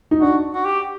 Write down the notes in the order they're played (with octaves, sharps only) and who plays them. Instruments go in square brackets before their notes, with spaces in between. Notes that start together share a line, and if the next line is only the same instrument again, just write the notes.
[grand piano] D#4
[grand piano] D4 [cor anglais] F#4
[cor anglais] F#4
G4